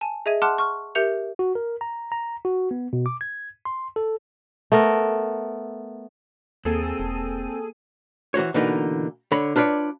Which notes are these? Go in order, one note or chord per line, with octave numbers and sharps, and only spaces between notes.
G#5 A5
G#4 D#5 E5 G#6 D#7
F#5 A5 C6 D6 F6 F#6
C#6 F6
G4 A#4 E5 G6 C#7 F7
F#4
A#4
A#5
A#5
F#4
B3
B2
D6
G#6
C6
A4
A3 B3 A#4
D#2 A#3 C4 G#4 A4 D#7
E1
E3 F#4 C5 C#5
B2 D3 E3 A#3 D#4 B4
D3 C#5 B5
D4 F4 B4 C#5 D5